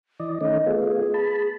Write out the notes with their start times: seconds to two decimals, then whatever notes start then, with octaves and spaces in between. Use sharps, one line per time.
0.19 E3 D5 D#5
0.41 D#3 A3 C#4 D#5
0.66 A3 B3 F4 G#4
1.14 A5 B5